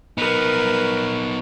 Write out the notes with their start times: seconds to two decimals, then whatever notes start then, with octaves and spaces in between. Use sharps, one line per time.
0.18 B3 D#4 A#4 B4